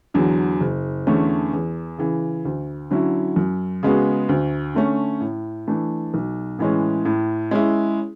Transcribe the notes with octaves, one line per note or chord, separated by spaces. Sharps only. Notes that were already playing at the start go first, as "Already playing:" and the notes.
E2 D3 F#3
F#1
E2 D3 A3 C#4
E2
C#3 E3
D2
D3 F#3 C#4 E4
F#2
C#3 G#3 B3 F#4
D2
D3 A3 C#4
A2
E3 A3 D4
B1
A2 E3 G#3 C#4
A2
G#3 C#4 E4